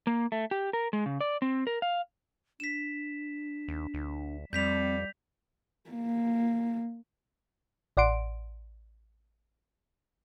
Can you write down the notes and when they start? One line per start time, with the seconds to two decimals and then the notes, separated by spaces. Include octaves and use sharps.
0.07 A#3
0.32 A3
0.51 G4
0.73 A#4
0.93 G#3
1.06 C#3
1.21 D5
1.42 C4
1.67 A#4
1.82 F5
2.60 D4 B6 E7
3.68 D#2
3.94 D2
4.53 F2 G3 C4 G6 B6 F7
5.90 A#3
7.97 A1 D5 F#5 C6 D7